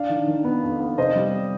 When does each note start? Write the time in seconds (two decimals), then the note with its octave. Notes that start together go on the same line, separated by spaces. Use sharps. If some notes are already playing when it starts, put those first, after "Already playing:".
Already playing: D4 D5 F5
0.09 D#3
0.27 D#3
0.44 B3
0.63 F2
0.80 B3
0.98 C3 C5 D#5
1.15 G3